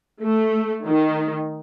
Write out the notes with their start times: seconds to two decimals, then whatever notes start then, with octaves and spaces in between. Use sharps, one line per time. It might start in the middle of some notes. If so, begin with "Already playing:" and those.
0.22 A3
0.85 D#3